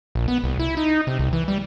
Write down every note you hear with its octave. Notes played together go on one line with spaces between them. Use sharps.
A#1
B3
C2
E4
D#4
C3
C2
E3
G3